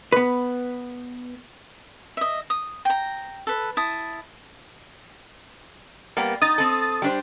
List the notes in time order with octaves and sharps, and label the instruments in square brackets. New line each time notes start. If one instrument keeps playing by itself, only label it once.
[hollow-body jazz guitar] B3 B4
[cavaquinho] D#5 E5
D#6
G5 A#5
A4 B4
E4 A5 D#6
[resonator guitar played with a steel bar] G3 A#3 B3
[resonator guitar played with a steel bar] D#4 [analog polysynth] D#6 A6
[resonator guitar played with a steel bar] C4 A4
G3 D4 C5